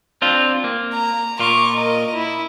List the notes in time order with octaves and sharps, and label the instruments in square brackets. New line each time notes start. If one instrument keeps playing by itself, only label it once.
[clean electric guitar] C4 D4 F4
A#3
[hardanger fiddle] A#5
[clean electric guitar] A#2 F4 [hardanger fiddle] C#6 D6
[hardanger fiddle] A#4 D#5
E4